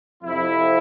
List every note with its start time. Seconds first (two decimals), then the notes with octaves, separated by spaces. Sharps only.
0.23 F2 C3 F3 E4